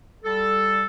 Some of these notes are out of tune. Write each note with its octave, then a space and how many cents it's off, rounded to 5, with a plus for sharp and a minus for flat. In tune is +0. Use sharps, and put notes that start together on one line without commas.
G3 +0 A4 +0